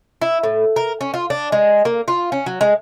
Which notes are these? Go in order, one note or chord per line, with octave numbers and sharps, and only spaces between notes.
E4
A2
A#4
C#4
F4
D4
G#3
A#3
F4
C#4
F#3
G#3